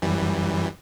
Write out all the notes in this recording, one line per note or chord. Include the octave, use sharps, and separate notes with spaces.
F#2 E3 G3